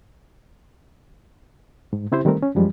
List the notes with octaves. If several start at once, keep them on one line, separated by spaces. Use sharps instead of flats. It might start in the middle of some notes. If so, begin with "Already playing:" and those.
G#2
C#3 C4 E4 G4 C5
D#3 G3 A3 C4 A#4
C#4
F#2 F3 G3 G#3